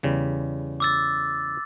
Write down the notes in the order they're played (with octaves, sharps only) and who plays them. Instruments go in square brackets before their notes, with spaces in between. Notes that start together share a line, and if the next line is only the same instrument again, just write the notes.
[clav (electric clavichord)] E2 C#3 G3
[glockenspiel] D6 E6 A6